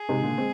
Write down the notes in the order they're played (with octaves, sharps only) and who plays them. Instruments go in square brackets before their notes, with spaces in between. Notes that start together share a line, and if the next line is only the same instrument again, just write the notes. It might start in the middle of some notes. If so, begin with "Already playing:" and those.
Already playing: [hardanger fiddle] G#4
[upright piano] G#2 C3
A#2 D3
G#3 C4